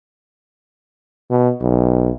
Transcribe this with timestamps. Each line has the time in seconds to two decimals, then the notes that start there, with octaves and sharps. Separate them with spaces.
1.31 B2
1.61 B1